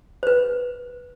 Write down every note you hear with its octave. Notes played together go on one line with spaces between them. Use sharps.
B4 C5